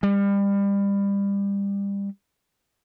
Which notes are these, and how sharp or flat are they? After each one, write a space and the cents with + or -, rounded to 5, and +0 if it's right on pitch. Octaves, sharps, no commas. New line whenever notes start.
G3 +30